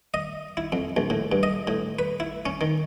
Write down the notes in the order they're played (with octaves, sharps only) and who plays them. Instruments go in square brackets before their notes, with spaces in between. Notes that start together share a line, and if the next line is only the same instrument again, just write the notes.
[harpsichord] D#5
E4
F2
A#1
A2
G2
D#5
A2
B4
E4
C#4
D#3